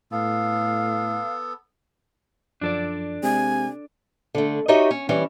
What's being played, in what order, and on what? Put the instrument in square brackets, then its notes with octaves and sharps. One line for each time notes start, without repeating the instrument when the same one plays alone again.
[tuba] A2 [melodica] B3 A4 [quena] F5
[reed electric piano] F#2 F3 [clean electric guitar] D4 A4 D5
[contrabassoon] C3 [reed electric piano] G#3 [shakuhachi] G#5
[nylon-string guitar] D3 A3
D#4 F#4 G4 C#5 D#5 E5
C#4
E3 G3 C#4